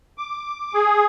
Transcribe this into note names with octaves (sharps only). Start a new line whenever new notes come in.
D6
G#4